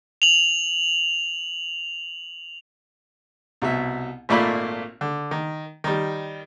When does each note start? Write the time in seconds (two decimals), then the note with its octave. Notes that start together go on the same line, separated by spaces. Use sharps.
0.22 F7 F#7
3.62 C2 B2 E5
4.29 G#1 A#2 A3 A#3 D5 B5
5.01 D3
5.31 D#3
5.84 D#3 G3